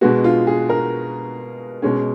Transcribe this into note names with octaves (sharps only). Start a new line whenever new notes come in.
B2 G#3 B3 F#4
F4
G#4
A#4
B2 G#3 C#4